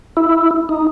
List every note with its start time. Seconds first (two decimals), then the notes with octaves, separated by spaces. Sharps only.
0.17 E4
0.69 D#4